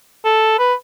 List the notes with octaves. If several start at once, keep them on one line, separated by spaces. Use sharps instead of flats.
A4
B4